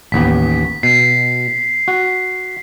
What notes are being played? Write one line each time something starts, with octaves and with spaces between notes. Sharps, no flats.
A1 D#2 B3 B6
B2 C7
F#4